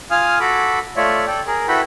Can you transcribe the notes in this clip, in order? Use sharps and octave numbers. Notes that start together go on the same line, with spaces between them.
F4 F5 G#5 D#6 F6
F#4 A4 B5 D6
A3 F4 C#5 D5 E5
A4 D5 G5
G#4 A#4
E4 F#4 A4 B4 G5 B5